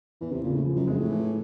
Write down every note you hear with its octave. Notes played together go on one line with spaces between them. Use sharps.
E2 E3
C3
A#2 C#3
A2
F3
F#2
F2 G#3
A2
E3